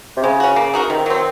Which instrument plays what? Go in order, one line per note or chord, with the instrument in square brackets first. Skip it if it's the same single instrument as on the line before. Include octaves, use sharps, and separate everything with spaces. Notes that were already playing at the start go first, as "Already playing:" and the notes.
[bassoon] C3
[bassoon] C#3 [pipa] G#3
[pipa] C#4 F#4
A#3
D#4 F#4 A#4
[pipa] C3 [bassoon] D#3
[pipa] F#3 C4